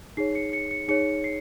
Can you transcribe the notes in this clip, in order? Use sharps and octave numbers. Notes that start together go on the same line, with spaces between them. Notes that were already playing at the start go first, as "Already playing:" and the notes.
D#4 G#4 C#5 C7
C#7
C#7
C#7
D#4 G#4 C#5 C#7
C7